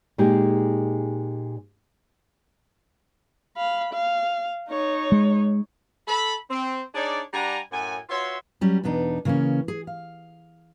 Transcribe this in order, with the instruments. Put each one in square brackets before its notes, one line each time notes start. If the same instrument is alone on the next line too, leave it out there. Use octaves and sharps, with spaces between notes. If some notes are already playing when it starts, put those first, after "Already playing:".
[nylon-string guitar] A#2 G#3 D#4 G4 G#4
[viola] F5 B5
F5
D#4 C#5
[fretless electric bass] G#3
[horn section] A4 B5
C4
D4 D#4 G#4 C#5 D5
G3 D4 F#5 G#5 A#5
F#2 A2 F#5 G#5
F4 F#4 B4 C#5 E5 C6
[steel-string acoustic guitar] F#3 G3 C#4
E2 B2 B3 D4 D#4
C#3 E3 A#3 C4 C#4
G#4
F5